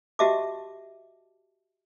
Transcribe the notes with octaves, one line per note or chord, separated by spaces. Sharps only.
F#4 G4 D#5 E5 A5 D6